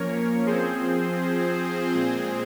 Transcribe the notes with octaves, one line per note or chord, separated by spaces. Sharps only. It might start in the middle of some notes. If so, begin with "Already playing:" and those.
Already playing: F3 A#3 C#4 A#4 C#5
F3 C4 G#4 C5
A#2 G#3 C4 G#4 C5